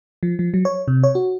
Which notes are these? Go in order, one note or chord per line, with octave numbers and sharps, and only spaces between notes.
F3
F3
F#3
C#5
C3
C#5
F#4